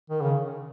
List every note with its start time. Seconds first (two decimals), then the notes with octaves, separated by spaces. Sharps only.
0.10 D#3
0.21 C#3